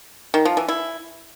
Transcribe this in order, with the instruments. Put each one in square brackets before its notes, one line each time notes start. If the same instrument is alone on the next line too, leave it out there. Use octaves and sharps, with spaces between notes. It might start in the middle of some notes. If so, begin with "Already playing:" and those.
[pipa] D#3
F3
E3
E4